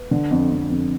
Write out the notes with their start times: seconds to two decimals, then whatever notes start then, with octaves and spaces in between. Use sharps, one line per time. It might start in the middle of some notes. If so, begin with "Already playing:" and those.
Already playing: B4
0.11 D3
0.31 F2
0.50 F2
0.70 F2